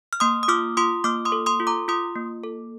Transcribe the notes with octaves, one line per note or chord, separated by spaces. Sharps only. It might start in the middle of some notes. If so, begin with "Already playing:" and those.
F6
A#3 C6 D#6
D#6
F4 D6 F6
F4 C6 D#6
A#3 D6 F6
C6 D#6
A4
C6 D#6
F4
A#5 D6
F4 C6 D#6
A#3
A4